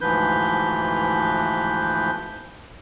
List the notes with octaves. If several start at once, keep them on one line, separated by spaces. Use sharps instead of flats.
D2 G#2 E3 F3 B4 G6